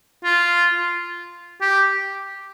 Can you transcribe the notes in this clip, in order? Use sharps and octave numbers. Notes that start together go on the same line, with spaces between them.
F4
G4